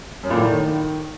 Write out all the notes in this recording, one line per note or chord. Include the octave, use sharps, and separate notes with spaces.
F#2
A#2
A2
D#3